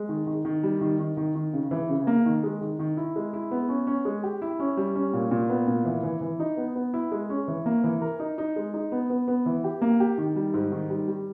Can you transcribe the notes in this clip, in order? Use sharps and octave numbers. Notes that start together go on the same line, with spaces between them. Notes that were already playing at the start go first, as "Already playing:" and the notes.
Already playing: G#3
D#3
D#3
D#3
G3
D#3
D#3
D#3
D#3
C#3
E3
C#3
A#3
D#3
G#3
D#3
D#3
E4
G#3
E4
B3
C#4
C#4
G#3
G4
E4
C#4
G3
C#4
A#2
A#2
B3
A#2
E3
E3
E3
D#4
B3
B3
E4
G#3
C#4
E3
A#3
E3
A#4
D#4
D#4
G#3
D#4
B3
B3
B3
E3
G4
A#3
G4
D#3
G3
G#2
D#3
G3
G3